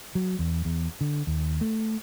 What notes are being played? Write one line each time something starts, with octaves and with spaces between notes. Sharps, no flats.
F#3
E2
E2
D3
D#2
A3